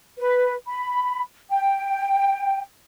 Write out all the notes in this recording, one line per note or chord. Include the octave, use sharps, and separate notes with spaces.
B4
B5
G5